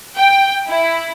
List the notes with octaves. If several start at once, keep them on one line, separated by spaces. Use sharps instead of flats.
G5
E4